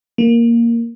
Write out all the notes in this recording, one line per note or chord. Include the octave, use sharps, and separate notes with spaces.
A#3